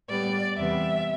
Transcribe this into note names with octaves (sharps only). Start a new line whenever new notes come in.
A2 G3 B3 D5
E2 C3 E3 G3 B3 E5